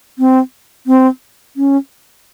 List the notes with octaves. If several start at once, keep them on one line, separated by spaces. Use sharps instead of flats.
C4
C4
C#4